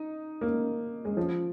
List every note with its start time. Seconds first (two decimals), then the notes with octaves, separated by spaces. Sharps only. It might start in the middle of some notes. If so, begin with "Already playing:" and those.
Already playing: D#4
0.41 A#3
1.05 G#3
1.17 F3